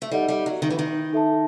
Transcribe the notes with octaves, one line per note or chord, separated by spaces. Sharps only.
A3
G3 D#4 A4 D#5 F#5
G3
F#3
D#3
E3
D#3
D#4 A4 E5 A5